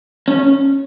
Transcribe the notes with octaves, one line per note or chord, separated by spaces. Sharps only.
C#4